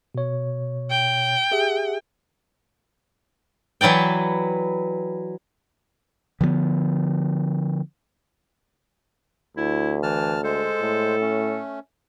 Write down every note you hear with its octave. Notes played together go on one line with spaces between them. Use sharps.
B2 C#5
G5
G4 G#4 E5
E3 F#3 B4 D5 G5
D3 F3 G3 B3
D2 E4
E3 A5 F6
G#3 A4 C5
A2
A3 C#4